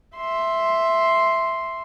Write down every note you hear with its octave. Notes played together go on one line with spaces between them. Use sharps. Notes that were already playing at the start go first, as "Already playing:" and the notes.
E5 C6